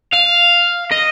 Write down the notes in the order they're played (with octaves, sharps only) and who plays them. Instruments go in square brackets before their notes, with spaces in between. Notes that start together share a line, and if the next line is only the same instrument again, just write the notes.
[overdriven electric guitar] F5
D#5